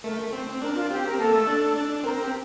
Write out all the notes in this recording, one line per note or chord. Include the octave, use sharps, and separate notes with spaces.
A3 A#4
C4
C4
D4 A#4
F4
C4 G4
A#4
A#3 A4
A3
D4
D4
C4 A#4
A#4
G4